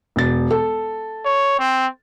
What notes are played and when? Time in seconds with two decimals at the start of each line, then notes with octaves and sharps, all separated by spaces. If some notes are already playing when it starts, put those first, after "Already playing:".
0.16 E1 A6
0.51 A4
1.25 C#5
1.59 C4